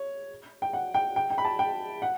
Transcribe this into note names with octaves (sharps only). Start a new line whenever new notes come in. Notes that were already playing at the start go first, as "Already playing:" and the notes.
Already playing: C#5
G5
F#5
G5
G5
G5
B5
A5
G5
F#5